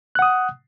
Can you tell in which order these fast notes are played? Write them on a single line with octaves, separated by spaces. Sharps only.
F#6 F#5 D#6